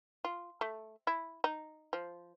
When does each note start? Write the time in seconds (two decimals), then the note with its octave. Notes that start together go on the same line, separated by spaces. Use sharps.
0.25 F4
0.61 A3
1.07 E4
1.44 D#4
1.93 F3